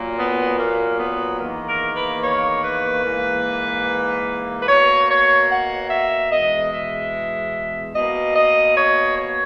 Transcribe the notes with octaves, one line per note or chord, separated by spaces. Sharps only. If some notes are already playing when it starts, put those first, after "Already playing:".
Already playing: A#2 F#3 A#3
B3
A#3
B3
E2 D#3 A#3
A#4
B4
C#5
B4
G#2 E3 A#3
B4
B2 A#3 C#5
C#5
F#5
E5
E2 B2 G#3 D#5
E5
B2 A#3 D#5
D#5
C#5
C#5